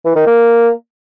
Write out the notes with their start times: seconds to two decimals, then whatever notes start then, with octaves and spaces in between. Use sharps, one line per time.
0.05 E3
0.16 D#3
0.26 A#3